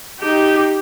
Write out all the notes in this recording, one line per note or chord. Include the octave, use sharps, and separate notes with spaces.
D#4 G4